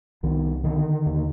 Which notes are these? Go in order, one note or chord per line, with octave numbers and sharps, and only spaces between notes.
C2 D#3
D3 D#3
D#2